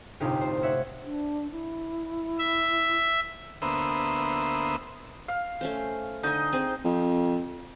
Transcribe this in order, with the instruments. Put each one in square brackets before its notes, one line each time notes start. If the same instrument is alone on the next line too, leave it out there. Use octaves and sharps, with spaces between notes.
[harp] G1 C2 A2 D#4 F4 G4
C5
C#5 E5 F#5
[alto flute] D4
E4
[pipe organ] E5
[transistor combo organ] D2 A#3 B3 C5 E5 D#6
[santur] F5
[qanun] A3 C#4 C5
[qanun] D3 G#5 [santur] D#4 D#5
[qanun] C4 G#4 C5
[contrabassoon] F2